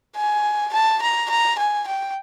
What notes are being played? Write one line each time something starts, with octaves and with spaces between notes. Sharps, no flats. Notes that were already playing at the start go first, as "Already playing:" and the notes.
G#5
A5
A#5
A#5
G#5
G5